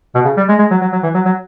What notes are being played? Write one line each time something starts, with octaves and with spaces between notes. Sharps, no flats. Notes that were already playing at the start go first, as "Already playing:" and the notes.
B2
C#3
G3
G#3
G#3
F#3
F#3
F#3
E3
F#3
F#3